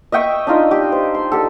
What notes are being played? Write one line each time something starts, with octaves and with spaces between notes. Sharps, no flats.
D#5 E5 G5 C#6
D4 D#4 F4 D#5
G4
C5
C6
G4 A4